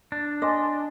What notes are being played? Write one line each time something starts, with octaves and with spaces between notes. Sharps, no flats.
D4
D#5 G#5 C6 D6